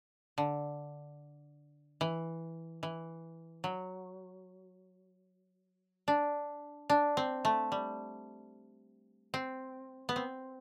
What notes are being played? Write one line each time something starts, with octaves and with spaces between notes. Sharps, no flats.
D3
E3
E3
F#3
D4
D4
C4
A3
G3
C4
B3
C4